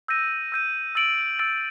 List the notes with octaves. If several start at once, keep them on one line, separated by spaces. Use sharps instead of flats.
E6 G6 A#6 D#7
E6 G6 A#6 D#7
E6 A6 D7 F#7
E6 A6 D7 F#7